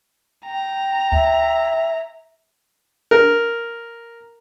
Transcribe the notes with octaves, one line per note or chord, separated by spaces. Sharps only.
G5 A#5
D2 E5
A#4